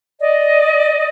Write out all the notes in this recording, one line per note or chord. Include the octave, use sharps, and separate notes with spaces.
D5 D#5